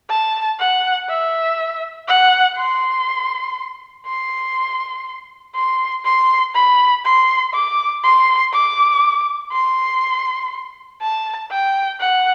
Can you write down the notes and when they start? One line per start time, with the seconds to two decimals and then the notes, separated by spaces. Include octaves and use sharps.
0.10 A5
0.59 F#5
1.08 E5
2.08 F#5
2.57 C6
4.06 C6
5.55 C6
6.05 C6
6.55 B5
7.05 C6
7.54 D6
8.04 C6
8.53 D6
9.52 C6
11.01 A5
11.51 G5
12.00 F#5